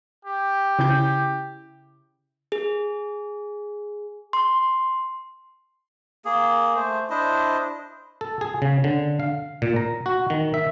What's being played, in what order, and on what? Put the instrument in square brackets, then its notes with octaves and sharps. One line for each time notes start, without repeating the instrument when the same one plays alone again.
[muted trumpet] G4
[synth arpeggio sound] C#3 E4 G6
[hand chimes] G#4
C6
[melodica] A#3 G#4
A3 C5
D4 E4 C5 D#5
[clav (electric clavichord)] A4
G#4
C#3
D3
F5
A#2
A#5
F#4
D#3
E5